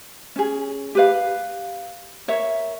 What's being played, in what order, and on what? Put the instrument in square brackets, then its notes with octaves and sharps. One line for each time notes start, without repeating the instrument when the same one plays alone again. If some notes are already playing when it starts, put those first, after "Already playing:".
[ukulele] C#4 G#4
G4 B4 F5
A#4 C#5 E5